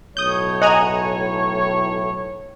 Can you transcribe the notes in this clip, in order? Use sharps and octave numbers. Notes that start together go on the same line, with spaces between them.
B1 A2 C#5 D#6 G6
D#5 F#5 G#5 A#5